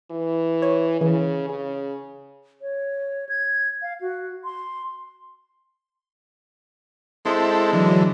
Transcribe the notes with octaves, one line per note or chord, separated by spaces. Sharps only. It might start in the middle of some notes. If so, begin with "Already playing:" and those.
E3
C#5
C#3 E3
C#3
C#5
G#6
F5
F#4
C6
G#3 C4 E4 A4
D3 E3 F#3